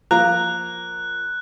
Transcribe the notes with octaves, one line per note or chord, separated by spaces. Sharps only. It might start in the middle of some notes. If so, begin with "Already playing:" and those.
F3 A#3 A#5 F#6